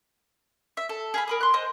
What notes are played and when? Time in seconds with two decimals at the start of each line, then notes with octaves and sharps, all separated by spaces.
0.77 E5
0.89 A4
1.14 G#4 F5 B5
1.28 A#4 B5 D#6
1.41 C6 F#6
1.54 C5 D#5